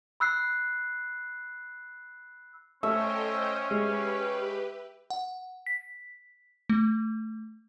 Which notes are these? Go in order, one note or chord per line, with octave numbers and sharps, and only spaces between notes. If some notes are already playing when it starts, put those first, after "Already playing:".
B5 E6 F#6 C7
A3 C#4 C5 D#5 E5 G5
G#3 G4 B4
F#5
B6
A3